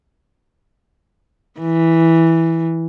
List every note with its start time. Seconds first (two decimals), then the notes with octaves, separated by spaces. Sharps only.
1.60 E3